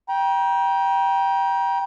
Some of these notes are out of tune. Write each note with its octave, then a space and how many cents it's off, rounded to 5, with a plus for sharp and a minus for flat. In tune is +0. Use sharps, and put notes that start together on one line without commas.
G5 +0 A#5 +40